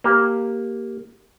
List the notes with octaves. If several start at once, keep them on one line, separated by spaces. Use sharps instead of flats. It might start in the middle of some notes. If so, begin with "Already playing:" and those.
A#3 G4